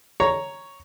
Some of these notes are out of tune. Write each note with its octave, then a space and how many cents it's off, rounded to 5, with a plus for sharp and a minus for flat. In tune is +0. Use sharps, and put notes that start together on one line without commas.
C#5 +0 A#5 +0